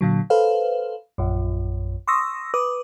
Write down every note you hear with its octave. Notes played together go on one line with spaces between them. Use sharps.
A#2 D3 F#3
A4 B4 C5 F5
A#1 F#2
C6 C#6 D#6 E6 A#6
B4 D6 D#6